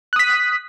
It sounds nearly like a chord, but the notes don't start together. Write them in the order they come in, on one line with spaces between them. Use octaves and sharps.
F#6 D#6 B6